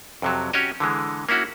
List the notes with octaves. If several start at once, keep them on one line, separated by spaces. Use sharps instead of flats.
F2 C3 F#3
C#4 F#4 G4 C#5 D#5
D3 E3 G#3
A#3 C#4 E4 F#4